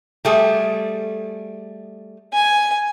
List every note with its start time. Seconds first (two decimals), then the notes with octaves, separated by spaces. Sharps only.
0.25 G3 A3 G#4
2.34 G#5